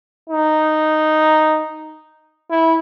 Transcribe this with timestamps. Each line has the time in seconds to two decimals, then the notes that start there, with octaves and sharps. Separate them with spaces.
0.30 D#4
2.50 E4